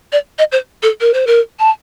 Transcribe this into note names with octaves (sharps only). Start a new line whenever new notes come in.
D5
D#5
C5
A4
A#4
C5
A#4
A5